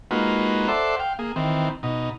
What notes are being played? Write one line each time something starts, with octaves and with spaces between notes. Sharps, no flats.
G#3 A#3 D#4 F4 F#4 B4
A4 C5 D5 E5 F#5 C6
F5 G5
A#3 G#4
D#3 E3 C4
B2 D#4